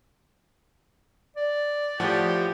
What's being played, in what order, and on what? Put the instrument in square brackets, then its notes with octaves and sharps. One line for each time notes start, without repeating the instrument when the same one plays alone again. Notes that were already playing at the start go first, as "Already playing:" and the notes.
[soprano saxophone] D5
[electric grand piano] A2 F3 F#5 [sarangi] G4